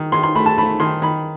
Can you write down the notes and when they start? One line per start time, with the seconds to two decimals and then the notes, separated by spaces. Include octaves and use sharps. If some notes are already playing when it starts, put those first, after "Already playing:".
Already playing: D#3
0.12 D#3 C6
0.23 C6
0.35 A3 B5
0.46 A5
0.58 A3 B5
0.80 D#3 C6
1.02 D#3 B5